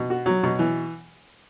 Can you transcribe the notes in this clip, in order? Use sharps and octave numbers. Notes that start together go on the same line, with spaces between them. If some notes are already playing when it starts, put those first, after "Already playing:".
Already playing: B2
F#4
F#3
B2
E3